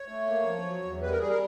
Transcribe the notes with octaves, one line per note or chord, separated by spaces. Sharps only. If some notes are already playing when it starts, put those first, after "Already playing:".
Already playing: C#5
A3
A#3
F3
F#3
E2
G3 B4
A#4
G3 G#4
A#4